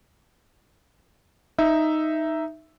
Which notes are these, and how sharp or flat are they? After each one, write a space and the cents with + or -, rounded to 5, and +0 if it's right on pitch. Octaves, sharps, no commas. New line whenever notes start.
D#4 +0 E5 +0